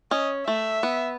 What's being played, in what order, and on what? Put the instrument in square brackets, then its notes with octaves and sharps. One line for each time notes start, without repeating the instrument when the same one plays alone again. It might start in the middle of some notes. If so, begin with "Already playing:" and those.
[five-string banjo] C#4 [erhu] D#5
[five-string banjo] A3 [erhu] E5
[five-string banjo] B3